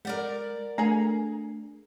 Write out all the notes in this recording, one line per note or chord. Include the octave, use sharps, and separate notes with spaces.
G#3 A#4 D5 F#5
A3 D4 G#4 A#5